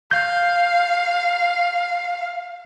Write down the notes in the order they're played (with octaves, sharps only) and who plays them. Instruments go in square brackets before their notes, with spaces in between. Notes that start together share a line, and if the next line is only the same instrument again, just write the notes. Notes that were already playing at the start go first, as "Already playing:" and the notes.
[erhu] F5 [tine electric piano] G6